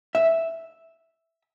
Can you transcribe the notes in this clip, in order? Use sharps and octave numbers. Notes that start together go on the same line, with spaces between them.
E5